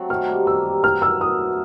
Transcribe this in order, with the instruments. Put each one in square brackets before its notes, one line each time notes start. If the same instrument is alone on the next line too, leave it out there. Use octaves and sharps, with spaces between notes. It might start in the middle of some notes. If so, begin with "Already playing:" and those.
Already playing: [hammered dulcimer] F#3 A3 C4
[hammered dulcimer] D#3 [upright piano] F6
[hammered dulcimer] G3 A#3
[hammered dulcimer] D#3 [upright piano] E6
[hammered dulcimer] G3 A#3
[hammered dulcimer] B2 [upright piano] F6
[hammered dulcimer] F#3 A3 [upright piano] E6
[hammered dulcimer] B2 [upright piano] D#6
[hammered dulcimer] F#3 A3